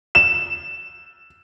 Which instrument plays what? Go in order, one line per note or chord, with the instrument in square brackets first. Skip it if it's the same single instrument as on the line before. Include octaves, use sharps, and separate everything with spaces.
[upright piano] E7